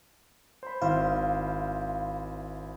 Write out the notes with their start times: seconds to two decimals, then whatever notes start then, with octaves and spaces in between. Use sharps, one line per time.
0.63 C5 B5
0.82 G#1 E4 C5 F5